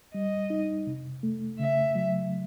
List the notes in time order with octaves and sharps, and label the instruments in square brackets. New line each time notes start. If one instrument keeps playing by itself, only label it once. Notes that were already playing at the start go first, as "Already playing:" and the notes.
[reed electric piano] G3 [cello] D#5
[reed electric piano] D#4
C3
A3
[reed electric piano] C#3 [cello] E5
[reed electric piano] F#3